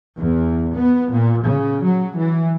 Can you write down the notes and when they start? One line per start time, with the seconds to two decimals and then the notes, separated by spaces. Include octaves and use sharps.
0.19 E2
0.75 B3
1.11 A#2
1.45 C#3
1.85 F#3
2.18 E3